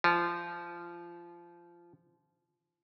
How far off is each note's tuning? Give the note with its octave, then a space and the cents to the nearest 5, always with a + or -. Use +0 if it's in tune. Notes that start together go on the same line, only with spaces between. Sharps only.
F3 -20